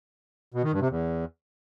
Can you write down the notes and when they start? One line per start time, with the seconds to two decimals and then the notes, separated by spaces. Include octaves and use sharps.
0.54 B2
0.63 D#3
0.72 G2
0.81 C3
0.90 E2